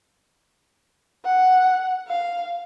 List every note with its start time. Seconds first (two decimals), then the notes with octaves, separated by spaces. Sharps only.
1.25 F#5
2.08 F5